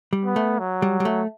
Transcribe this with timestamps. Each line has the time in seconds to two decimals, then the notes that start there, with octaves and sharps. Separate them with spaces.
0.13 G3
0.25 B3
0.36 A3
0.59 F#3
0.82 G3
1.00 G3
1.05 A3